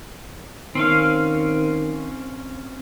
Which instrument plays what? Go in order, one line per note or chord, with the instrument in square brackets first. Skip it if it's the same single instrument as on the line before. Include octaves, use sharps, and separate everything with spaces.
[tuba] D#3 [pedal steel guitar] C4 C#4 F5